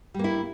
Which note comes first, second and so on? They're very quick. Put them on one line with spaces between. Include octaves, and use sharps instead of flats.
G3 A#3 E4